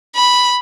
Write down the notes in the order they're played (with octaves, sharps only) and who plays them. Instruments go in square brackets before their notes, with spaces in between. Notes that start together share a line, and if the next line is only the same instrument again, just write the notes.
[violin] B5